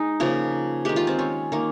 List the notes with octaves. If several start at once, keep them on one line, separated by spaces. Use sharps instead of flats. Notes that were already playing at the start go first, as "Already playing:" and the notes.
Already playing: G#3 D#4
C#3 F3 A#3
D#3 G#3 G4
F4
C4
C#4
D#3 A#3